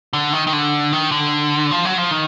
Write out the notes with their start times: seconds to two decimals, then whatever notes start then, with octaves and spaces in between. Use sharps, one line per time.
0.13 D3
0.33 D#3
0.47 D#3
0.53 D3
0.93 D#3
1.12 D3
1.71 F3
1.85 F#3
1.98 F3
2.11 D#3